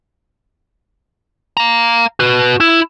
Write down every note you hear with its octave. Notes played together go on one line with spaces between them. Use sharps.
F5 A#5
F#4 B4
E4